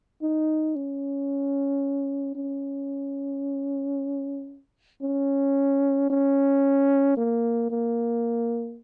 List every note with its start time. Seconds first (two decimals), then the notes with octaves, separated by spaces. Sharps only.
0.22 D#4
0.76 C#4
2.35 C#4
5.02 C#4
6.10 C#4
7.17 A#3
7.70 A#3